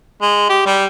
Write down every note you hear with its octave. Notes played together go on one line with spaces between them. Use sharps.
G#3
G4
G3